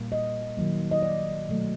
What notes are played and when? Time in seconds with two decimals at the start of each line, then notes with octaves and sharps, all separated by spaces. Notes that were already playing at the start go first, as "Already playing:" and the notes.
Already playing: A#2 G3 A#3
0.12 D#5
0.57 D#3 F#3 A#3
0.91 D#5
1.03 D5
1.49 B2 F#3 A3